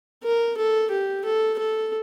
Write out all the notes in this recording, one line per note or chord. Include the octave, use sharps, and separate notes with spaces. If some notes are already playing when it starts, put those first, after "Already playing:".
A#4
A4
G4
A4
A4